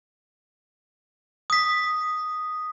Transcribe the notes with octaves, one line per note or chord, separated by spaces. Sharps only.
D#6 B6